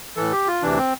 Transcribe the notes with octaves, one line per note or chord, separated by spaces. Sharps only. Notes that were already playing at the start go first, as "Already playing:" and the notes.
A2 E3 A4
G4
F4
D2 C3 E3 D4
C4